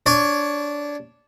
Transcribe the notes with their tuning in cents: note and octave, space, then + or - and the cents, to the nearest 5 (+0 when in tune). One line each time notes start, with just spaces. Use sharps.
D4 -15 C#5 +0